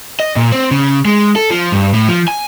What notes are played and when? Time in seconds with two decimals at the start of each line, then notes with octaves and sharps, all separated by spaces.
0.20 D#5
0.36 A#2
0.52 C4
0.71 C#3
1.05 G#3
1.36 A4
1.50 F3
1.72 G2
1.93 A2
2.08 F3
2.28 G#5